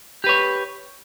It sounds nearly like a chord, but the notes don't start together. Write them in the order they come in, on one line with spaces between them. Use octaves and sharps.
G4 B4 C#5